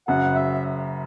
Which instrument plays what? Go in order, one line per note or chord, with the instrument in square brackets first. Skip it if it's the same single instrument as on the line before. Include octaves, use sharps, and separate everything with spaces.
[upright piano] F#1 F#2 C#3 [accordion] F#5
[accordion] E5